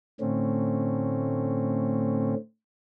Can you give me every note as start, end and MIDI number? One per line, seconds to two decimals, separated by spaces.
0.21 2.35 45
0.21 2.35 50
0.21 2.35 57
0.21 2.35 60
0.21 2.35 61